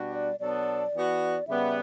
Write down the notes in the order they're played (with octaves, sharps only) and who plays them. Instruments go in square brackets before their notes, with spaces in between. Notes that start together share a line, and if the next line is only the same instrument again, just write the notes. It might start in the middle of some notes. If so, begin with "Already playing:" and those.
Already playing: [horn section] B2 G3 D4 F#4
[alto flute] D5
[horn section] B2 F#3 B3 D4 A4 [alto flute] D5
[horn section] E3 B3 F#4
[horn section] C#3 G3 B3 [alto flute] E5